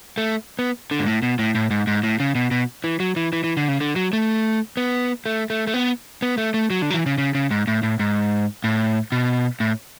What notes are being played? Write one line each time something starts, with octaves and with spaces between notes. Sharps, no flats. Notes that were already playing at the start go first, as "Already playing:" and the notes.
A3
B3
D3
G#2
A2
B2
A2
A2
G#2
G#2
A2
C#3
B2
B2
E3
F#3
E3
E3
E3
D3
C#3
D3
F#3
A3
B3
A3
A3
A3
B3
B3
A3
A3
F#3
D3
F#3
E3
C#3
C#3
C#3
G#2
A2
A2
G#2
A2
B2
A2